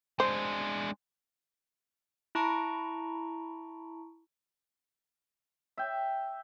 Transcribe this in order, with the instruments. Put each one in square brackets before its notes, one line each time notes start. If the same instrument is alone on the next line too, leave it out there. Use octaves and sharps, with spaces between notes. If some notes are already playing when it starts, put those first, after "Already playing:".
[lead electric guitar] G#3 D4 [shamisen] C5
[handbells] E4 A5 A#5 C#6 D7
[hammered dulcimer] E5 G5